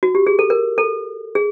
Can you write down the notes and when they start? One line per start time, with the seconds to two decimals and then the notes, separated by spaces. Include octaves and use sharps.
0.03 F#4
0.15 G4
0.27 G#4
0.39 A4
0.50 A#4
0.78 A4
1.35 G#4